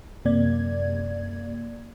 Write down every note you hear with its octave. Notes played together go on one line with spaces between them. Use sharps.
F#2 C3 A#3 D5 G#6